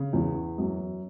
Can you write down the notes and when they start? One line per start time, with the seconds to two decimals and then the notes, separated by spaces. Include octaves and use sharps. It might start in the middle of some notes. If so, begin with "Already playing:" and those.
Already playing: C#3
0.13 E2
0.58 F#2